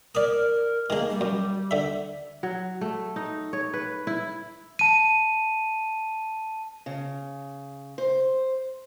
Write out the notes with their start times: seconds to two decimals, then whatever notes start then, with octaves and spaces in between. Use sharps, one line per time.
0.15 A#4 D5 D#6
0.90 D#3 G#3 A#3
1.09 G3
1.21 F#2
1.71 D3 E5
2.43 F#3
2.81 A3
3.16 D#4
3.53 C#5
3.73 B4
4.07 E4
4.79 A5 D#7
6.86 C#3
7.98 C5